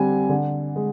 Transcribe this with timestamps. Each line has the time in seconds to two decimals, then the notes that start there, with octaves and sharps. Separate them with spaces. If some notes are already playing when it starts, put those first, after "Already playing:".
Already playing: D3 G3 C4 G#5
0.29 D3
0.76 G#3